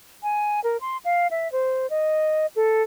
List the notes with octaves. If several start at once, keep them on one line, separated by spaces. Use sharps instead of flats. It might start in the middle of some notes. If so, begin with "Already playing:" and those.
G#5
A#4
C6
F5
E5
C5
D#5
A4